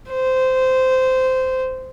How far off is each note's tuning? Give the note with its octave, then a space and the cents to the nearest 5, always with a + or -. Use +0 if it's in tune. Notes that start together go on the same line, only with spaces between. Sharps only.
C5 -15